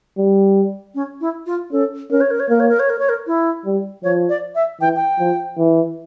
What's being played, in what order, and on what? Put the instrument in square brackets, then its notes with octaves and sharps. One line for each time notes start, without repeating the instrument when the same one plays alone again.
[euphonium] G3
[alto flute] C#4
E4
F4
[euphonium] C#4 [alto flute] A4
[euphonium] C#4 [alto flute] A#4
[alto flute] C#5
A#4
C#5
[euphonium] A#3 [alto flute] A#4
[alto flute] C#5
A#4
C#5
A#4
C#5
A#4
E4
[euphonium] G3
[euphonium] F3 [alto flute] C#5
[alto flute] D5
E5
[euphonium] E3 [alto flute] G5
[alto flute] G5
[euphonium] F3
E3